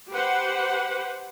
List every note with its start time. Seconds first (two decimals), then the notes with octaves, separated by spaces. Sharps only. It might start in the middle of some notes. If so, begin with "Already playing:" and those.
0.11 G4 B4 C5 F#5